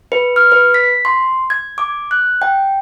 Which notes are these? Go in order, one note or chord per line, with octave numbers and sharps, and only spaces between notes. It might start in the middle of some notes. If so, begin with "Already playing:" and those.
B4
F6
B4
B6
C6
G#6
D6
F#6
G5